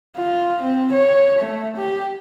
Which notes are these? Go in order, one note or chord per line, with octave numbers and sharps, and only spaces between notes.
F4
C4
C#5
A3
G4